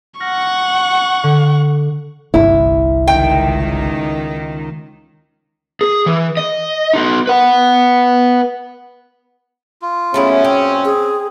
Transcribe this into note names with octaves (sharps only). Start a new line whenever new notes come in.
F#5 C#6 F6 A#6
D3
G1 C2 E4
C#2 D#3 G5
G#4
E3
D#5
D#4 F#4
B4 F#5
F4
F#2 A#2 A3 B3 C#4 E4 G#4
C4 G5
G#4